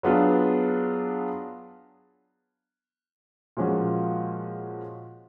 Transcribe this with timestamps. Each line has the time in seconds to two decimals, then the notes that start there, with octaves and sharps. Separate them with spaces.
0.03 F#3 B3 D4 F4 G#4
3.57 A#2 F3 G#3 C#4 F#4